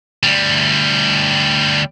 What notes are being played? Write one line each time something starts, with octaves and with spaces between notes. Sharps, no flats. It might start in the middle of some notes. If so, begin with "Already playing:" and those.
D2 G3